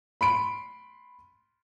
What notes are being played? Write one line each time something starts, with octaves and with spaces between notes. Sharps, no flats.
B5 C6 D7